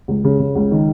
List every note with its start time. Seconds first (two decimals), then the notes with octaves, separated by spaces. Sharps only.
0.08 C#2
0.24 C#3
0.39 C#3
0.55 C#2
0.71 D#3